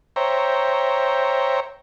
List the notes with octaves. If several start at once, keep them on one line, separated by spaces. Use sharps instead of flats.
C5 C#5 E5 G5 A#5